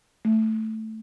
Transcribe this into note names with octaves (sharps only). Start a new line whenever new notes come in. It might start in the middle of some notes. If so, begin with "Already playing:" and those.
A3